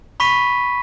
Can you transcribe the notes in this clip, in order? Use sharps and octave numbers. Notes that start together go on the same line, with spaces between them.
B5 C#6 B6 D#7